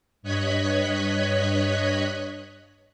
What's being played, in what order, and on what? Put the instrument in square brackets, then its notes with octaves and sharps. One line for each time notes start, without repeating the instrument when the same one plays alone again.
[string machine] G2 C#5 D#5 F#6 G#6 B6